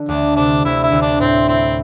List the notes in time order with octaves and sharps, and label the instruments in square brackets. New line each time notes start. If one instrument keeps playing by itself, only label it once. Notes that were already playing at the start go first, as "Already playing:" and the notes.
Already playing: [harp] D3
[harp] D2 [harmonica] D4
[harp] C3 [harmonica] D4
[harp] D2 [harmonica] E4
[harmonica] E4
[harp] D2
[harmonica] D4
[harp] A2 [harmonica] C4
[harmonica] C4 [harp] E4